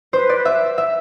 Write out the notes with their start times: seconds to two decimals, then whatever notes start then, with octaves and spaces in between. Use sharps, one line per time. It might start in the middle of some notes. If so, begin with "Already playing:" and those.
0.13 B4 C5
0.29 D5
0.45 E5
0.78 E5